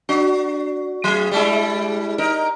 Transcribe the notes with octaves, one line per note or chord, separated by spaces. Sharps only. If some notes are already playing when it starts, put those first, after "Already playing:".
D4 F#4
F#3 G#4
G3 G#3 E4
D#4 A#4